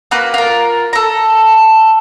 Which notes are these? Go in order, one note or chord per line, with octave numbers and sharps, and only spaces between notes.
A#3 F#4 B4
F4 A#4
A4 A#5